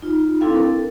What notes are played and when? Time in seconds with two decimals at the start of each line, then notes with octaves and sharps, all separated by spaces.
0.02 D#4 F4
0.41 C4 D4 E4 A4 F5 G5
0.55 A4 A#4